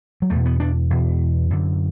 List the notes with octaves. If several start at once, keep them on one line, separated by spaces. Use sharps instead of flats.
F#3
E2 B2 A3
B3
D4
E2 B2
F#2 D3